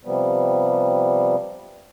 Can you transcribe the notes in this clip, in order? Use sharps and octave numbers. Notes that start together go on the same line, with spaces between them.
C3 F3 G3 B3